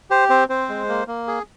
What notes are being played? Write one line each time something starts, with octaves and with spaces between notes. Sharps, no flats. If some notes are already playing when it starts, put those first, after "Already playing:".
G4 C5
C4 C5
C4 C5
G#3
A#3
A#3
G#4